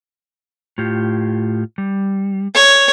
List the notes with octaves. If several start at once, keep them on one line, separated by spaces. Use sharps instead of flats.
A2 F4 G4
G3
C#5